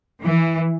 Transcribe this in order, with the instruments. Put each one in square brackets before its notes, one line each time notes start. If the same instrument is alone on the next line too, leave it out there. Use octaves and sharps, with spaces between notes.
[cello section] E3